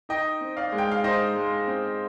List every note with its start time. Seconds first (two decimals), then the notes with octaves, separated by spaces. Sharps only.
0.09 D#4 D#5 G5
0.41 C4
0.57 D5 F5
0.72 G#3
0.78 G5
0.91 F5
1.04 D#4 C5 D#5
1.36 G#3
1.68 C4